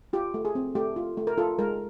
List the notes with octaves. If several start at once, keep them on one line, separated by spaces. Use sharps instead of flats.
F4 G4
A3
G#4
C4
A3 G4
F4
A3
A#4
F4 A4
G#3 A#4